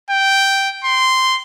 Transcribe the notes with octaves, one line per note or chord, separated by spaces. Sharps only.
G5
C6